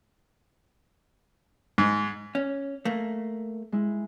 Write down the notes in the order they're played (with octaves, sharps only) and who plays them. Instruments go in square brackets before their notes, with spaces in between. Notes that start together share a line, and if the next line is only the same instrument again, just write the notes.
[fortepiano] G#2
[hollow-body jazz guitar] C#4
A3 A#3
[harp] G#3 E4